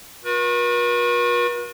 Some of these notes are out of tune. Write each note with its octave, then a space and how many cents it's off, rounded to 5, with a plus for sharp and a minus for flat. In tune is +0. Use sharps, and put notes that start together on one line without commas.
F#4 -40 B4 -45